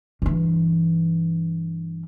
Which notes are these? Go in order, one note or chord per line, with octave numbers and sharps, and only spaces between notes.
G2 E3